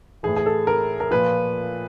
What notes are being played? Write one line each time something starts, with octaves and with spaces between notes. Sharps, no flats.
A2 E3 G#4
G#4
A4
A#4
A#4
A#2 F3 B4